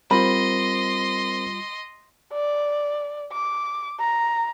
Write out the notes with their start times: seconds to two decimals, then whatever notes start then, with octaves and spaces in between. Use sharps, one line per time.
0.11 G3 C4 F4 A#4 C5 D#5 B5 C6
2.33 D5
3.33 D6
4.00 A#5